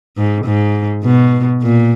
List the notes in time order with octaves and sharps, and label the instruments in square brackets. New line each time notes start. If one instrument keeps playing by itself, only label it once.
[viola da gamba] G#2
G#2
B2
A#2